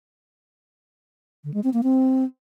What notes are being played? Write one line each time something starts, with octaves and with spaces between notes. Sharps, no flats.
D3
G#3
C4
A#3
C4